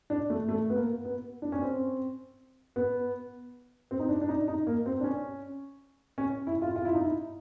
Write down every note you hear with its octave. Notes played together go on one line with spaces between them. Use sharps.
D4
A3
A3
B3
A#3
B3
D4
C#4
C4
B3
C4
D#4
D4
D4
D#4
D#4
A#3
C4
D4
C#4
C#4
E4
F4
F4
E4
D#4
E4